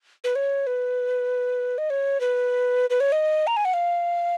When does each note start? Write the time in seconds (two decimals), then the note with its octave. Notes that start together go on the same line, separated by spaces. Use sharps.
0.24 B4
0.36 C#5
0.67 B4
1.78 D#5
1.90 C#5
2.21 B4
2.90 B4
3.00 C#5
3.12 D#5
3.47 A#5
3.57 G#5
3.65 F#5
3.74 F5